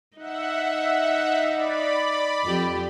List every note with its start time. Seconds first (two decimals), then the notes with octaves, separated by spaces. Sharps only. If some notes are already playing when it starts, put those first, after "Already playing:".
0.17 D#4 E5 F#5
1.54 D5 B5
2.44 F2 G4